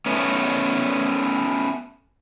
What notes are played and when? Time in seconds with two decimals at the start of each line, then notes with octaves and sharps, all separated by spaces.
0.06 A3 B3 C#4